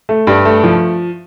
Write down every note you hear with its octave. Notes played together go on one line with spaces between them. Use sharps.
A3
G2
A3
F3